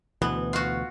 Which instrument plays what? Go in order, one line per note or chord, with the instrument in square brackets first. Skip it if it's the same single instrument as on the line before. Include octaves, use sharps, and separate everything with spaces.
[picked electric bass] D2 B2 E3 [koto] B3
[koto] F4 F#4